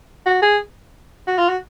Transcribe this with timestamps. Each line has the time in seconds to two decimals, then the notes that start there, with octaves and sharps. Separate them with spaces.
0.26 F#4
0.42 G#4
1.27 F#4
1.38 F4
1.49 F#4